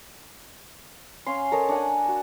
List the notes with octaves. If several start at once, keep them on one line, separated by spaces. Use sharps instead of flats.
C#4 F5 C6
A4 A#4 C#5 D#5
D4 F#5 G#5
F#4 A5